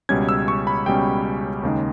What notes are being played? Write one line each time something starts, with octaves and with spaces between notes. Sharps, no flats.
C#2 B2 G3 C#4 G#6
E6
C#6
B5
C#2 B2 G3 C#4 G5
D#2 C#3 G#3 D#4